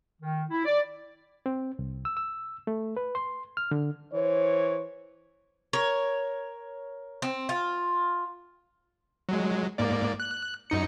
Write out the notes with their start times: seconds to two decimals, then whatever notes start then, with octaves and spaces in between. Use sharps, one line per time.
0.21 D#3
0.50 E4
0.65 D5
1.46 C4
1.79 C2
2.05 E6
2.17 E6
2.67 A3
2.97 B4
3.15 C6
3.57 F6
3.71 D3
4.13 E3 C5 C#5
5.73 A#4 C#5
7.22 C4
7.49 F4
9.29 F#3 G#3
9.78 G#2 A#3 D5
10.20 F#6
10.70 F#2 D#4 C#7